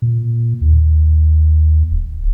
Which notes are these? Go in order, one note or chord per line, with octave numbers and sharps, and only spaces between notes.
A#2
D#2
D1